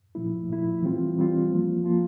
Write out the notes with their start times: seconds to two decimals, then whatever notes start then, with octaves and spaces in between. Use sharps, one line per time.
0.15 A#2 F3 A3 E4
0.49 A#2 F3 A3 E4
0.83 E3 G3 C4 F4
1.17 E3 G3 C4 F4
1.52 F3 A#3 F4
1.84 F3 A#3 F4